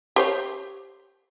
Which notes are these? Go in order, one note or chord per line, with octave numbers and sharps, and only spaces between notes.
G4 C5 C#5